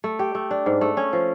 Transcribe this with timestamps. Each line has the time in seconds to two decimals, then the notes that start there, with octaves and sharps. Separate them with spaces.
0.04 A3
0.19 G4
0.35 A3
0.51 D4
0.66 G#2
0.81 A3
0.97 C#4
1.13 F3